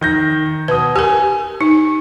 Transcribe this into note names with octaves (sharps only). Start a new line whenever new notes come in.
D#3 G6 A#6
B2 B4 D#6
G4 A#4 G#5
D#4